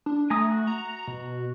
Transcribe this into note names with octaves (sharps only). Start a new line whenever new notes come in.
D4
A3 G#5 A#5 D#6
F#4
A#5
B2